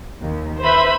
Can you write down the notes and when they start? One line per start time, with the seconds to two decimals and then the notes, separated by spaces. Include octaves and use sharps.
0.19 D#2
0.63 B4 C5 E5 B5